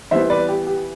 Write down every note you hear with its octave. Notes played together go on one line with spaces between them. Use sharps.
E3 G3 B3 C5 E5
B4 D5
G4
G4